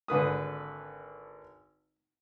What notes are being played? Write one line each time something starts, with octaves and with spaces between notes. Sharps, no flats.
G#1 D3 B4 D#6